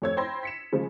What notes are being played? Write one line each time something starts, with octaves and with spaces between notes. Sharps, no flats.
F2 A3 C#5 E6 G#6
C5 G5 B5 C6 A#6
B6 C#7 E7
C#3 F3 G#3